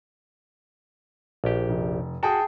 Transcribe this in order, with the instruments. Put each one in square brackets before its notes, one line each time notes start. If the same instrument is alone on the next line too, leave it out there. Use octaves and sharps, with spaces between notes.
[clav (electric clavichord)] A#1 G4
[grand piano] F1
[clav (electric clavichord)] F#4 [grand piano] G#4 G5 A5